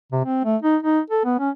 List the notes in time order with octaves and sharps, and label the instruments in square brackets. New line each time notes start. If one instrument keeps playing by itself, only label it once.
[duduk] C3
C4
A3
D#4
D#4
A4
B3
C#4